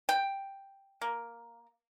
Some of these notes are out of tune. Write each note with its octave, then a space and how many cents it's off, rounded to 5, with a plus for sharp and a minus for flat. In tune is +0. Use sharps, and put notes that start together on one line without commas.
G5 +5
A#3 +5